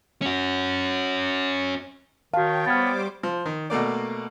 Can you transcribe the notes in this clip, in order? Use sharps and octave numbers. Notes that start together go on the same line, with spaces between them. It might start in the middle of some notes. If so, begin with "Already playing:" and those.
C#4 F#4
D#3 F#4 C#5 F5 G5 A5
G3 B3 C5 D6 F6 G#6 A6
F3
D#3
B2 A3 A#3 D5